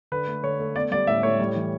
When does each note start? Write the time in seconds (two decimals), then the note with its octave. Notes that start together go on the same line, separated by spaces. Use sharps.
0.12 D3 B4
0.28 A3
0.43 D3 C#5
0.59 A3
0.75 B3 D5
0.91 G3 D5
1.07 A2 E5
1.23 A2 C#5
1.40 G3
1.56 E3